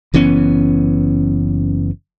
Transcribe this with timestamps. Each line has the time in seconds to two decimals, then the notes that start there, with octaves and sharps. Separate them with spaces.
0.14 F#1 E3 B3 C#4